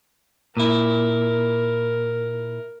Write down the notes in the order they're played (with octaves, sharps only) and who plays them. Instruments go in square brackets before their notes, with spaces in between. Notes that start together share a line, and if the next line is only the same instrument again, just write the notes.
[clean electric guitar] A#2 E4 [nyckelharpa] A#4